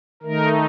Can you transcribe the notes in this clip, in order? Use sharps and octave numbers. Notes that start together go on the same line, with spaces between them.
D#3 A3 D#4 A#4